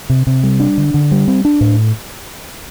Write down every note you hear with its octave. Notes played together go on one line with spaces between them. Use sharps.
C3
C3
G3
D4
D3
D3
G3
C4
D4
A2